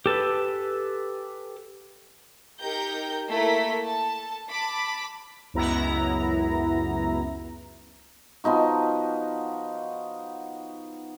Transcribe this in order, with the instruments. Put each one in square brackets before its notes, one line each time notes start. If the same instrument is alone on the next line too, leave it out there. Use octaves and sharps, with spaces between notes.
[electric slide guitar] G4 A4 B4
[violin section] D#4 G4 A#4 G5 A#5 G6
A3 A#3 E4 A#4 B6
A4 A5
A5 B5 D6
[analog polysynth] C#2 F#2 B3 E4 A#5
[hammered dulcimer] F3 B3 D#4 F#4